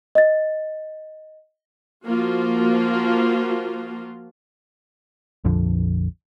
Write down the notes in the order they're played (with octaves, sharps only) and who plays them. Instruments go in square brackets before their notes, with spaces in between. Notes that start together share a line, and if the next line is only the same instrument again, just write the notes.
[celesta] D#5 A6
[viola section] F3 A#3 F4 F#4
[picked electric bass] A#1 F2 D3 F3